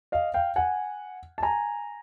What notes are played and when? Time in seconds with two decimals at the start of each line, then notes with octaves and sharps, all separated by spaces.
0.12 D#5 F5
0.34 F5 G5
0.56 F#5 G#5
1.38 A5
1.43 G#5 A#5